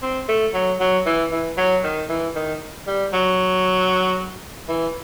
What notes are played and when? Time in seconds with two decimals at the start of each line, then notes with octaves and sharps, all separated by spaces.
0.02 C4
0.29 A3
0.54 F#3
0.80 F#3
1.06 E3
1.32 E3
1.58 F#3
1.84 D#3
2.10 E3
2.36 D#3
2.87 G3
3.13 F#3
4.68 E3